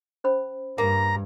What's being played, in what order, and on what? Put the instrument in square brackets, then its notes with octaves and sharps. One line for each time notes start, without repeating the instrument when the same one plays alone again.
[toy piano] C#4 C5 B5
[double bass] G2 [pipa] A#3 [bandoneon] A#5